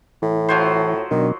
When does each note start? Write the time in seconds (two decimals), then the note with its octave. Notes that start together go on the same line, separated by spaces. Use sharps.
0.22 A2 E3
0.49 F3 F#3 C5
1.11 B2 D#3 F#3 D4